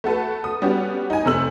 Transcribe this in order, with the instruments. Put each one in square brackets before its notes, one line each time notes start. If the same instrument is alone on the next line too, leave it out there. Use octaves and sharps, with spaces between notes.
[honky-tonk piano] A3 F#4 A4 B4
D#6
G3 B3 C#4 F#4 G4
D#4 G#5
F1 C3 A3 E6 F#7